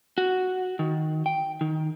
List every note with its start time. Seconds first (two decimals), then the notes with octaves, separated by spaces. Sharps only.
0.18 F#4
0.79 D#3
1.26 G5
1.61 D#3